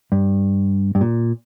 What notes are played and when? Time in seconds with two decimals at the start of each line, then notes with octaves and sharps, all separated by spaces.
0.12 G2
0.95 G2
1.01 A#2